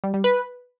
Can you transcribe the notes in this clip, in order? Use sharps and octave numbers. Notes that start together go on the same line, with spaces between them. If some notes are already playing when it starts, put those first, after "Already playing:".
G3
G3
B4